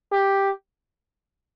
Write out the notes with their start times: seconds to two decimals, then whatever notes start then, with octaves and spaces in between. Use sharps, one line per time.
0.12 G4